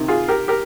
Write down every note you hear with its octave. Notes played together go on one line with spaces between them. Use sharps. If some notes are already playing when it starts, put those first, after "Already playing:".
Already playing: C3 D#3
F4 G#4
G4 A#4
G4 A#4